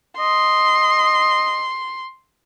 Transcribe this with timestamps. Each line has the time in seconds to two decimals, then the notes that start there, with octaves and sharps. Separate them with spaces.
0.19 D#5 C6